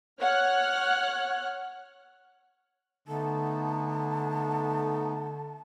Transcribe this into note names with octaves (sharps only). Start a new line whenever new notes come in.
C#5 F#5 F6 F#6
D3 A3 B3 D#4 A5